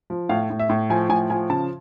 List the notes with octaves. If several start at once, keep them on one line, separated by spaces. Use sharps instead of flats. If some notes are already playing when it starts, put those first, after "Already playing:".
F3
A2 F5
A2
E5
A2
F3 G#5
A2 G#5
F3 G#5
C#3 A5